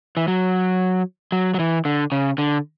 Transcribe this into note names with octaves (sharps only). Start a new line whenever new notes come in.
E3
F#3
F#3
F#3
E3
D3
C#3
D3